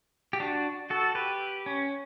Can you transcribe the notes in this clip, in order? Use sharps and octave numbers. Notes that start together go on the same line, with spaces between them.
G4
D4 F#4
F#4 A4
G4 B4
C#4